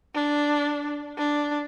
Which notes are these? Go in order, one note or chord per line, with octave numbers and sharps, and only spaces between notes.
D4
D4